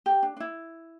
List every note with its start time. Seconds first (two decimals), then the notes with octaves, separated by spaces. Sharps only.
0.06 G4
0.23 D4
0.37 D4
0.40 E4